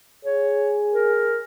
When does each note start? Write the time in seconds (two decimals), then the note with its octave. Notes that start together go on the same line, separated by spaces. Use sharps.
0.25 G#4 C#5
0.93 A#4